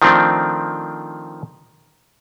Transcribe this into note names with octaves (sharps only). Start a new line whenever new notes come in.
D#3 F3 A3 C4 D4